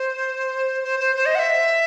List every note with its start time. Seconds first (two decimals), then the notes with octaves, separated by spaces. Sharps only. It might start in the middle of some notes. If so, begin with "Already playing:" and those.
Already playing: C5
0.83 C5
1.00 C5
1.16 C5
1.26 D#5
1.35 F#5
1.39 E5